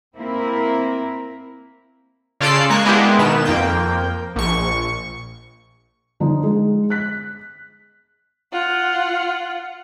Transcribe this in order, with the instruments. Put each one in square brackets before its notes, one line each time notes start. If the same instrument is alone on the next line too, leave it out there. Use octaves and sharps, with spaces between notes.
[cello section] A#3 C4 E4 A#4
[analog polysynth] C#3 F4 A4 D5 C7 E7
G#3 A#3 C#6 F#6
G#3 A#3 B3 D4 E4 G4
B2 D#3 B3 E7
F2 A#3 G5
A#1 C#6
[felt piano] D3 F3 D#4
G#3
F#6 B6
[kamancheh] F4 F#5